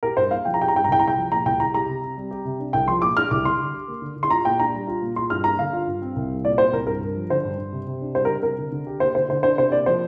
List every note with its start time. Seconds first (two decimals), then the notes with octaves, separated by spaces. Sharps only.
0.03 G4 A#4
0.17 G2 C5
0.31 A#3 F5
0.45 F3 G5
0.54 A#5
0.60 G4 G5
0.68 A#5
0.75 G2 G5
0.84 A#5
0.88 C2 G5
0.99 A#5
1.03 C2 G5
1.17 F3
1.31 A#2 A#5
1.45 C2 G5
1.60 C2 A#5
1.74 G4 A#5
1.89 C3
2.03 C4
2.17 G3
2.31 G4
2.45 C3
2.60 D4
2.73 C2 G5
2.88 F3 C6
3.02 A#2 D6
3.17 D4 F6
3.31 C2 D6
3.45 D3 C6
3.60 D3
3.74 G4
3.88 A#3
4.02 D3
4.17 D3
4.23 C6
4.30 F4 A#5
4.45 A#2 G5
4.59 D4 A#5
4.74 G3
4.87 F4
5.02 A#2
5.16 F4 C6
5.30 G2 F6
5.44 A#3 A#5
5.59 D3 F5
5.73 F4
5.88 G2
6.02 C4
6.16 C2
6.30 G3
6.44 A#2 D5
6.58 C4 C5
6.73 C2 A#4
6.87 G2 A#4
7.01 G2
7.16 F3
7.30 D3 C5
7.44 G2
7.58 G2
7.72 C3
7.87 C3
8.01 D4
8.15 G3 C5
8.25 A#4
8.29 C3
8.43 C3 A#4
8.58 D3
8.72 D3
8.87 G4
9.00 A#3 C5
9.15 D3 C5
9.29 D3 C5
9.43 D4 C5
9.57 C3 C5
9.72 A#3 D5
9.86 F3 C5